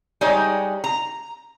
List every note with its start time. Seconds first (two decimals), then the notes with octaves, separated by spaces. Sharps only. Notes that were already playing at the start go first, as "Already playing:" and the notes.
0.21 G3 G#3 D#4 C#5
0.84 A#5